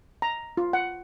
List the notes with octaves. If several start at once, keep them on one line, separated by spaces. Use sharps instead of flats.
A#5
F4
F#5